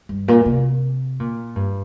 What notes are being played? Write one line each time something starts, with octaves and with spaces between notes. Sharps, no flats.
G2
A#2
C3
A#2
G2